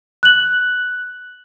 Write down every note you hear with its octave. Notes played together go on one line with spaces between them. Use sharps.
F#6 F#7